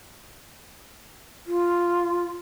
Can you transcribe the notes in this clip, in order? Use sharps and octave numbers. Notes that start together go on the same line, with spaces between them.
F4